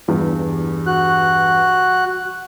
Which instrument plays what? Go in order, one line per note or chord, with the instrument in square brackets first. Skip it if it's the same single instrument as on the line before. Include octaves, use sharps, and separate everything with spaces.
[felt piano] E2 G2
[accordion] F#4 F#6